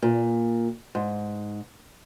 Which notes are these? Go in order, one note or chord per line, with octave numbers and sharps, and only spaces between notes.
A#2
G#2